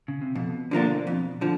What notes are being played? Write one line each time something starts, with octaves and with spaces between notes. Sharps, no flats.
C#3
C3
F2 B2
D3 F3 A#3 D4
F2
D3 F3